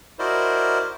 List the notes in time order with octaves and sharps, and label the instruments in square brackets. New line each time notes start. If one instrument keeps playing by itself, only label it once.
[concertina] E4 F#4 A#4 C5 D5 D#5